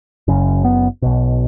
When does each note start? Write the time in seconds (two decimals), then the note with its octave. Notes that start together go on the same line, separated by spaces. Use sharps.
0.28 F#1 F#2 C#3
0.65 B3
1.02 B1 B2